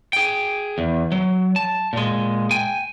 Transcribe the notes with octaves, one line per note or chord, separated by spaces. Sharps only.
G#4 G5
E2
F#3
A5
A#2 G#3
G5 G#5